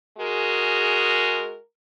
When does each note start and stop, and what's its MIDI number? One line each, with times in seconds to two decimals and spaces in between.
0.18 1.56 56
0.18 1.56 66
0.18 1.56 68
0.18 1.56 70